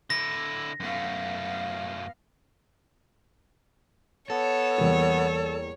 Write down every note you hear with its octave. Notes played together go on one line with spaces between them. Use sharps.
D3 E4 A#6
F#2 A3 B3 F5
B3 A4 C#5
E2 G3 A#3